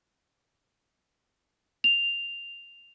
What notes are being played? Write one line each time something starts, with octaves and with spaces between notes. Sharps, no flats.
F7